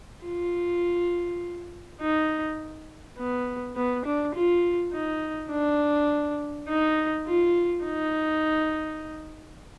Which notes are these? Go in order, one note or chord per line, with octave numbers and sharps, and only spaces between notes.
F4
D#4
B3
B3
D4
F4
D#4
D4
D#4
F4
D#4